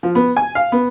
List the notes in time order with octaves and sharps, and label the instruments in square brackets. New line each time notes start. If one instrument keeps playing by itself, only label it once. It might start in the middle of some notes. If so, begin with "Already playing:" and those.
[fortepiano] F3
B3
G#5
F5
B3